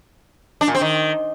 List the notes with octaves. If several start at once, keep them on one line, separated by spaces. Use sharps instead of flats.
D4
A#2
C4
D#3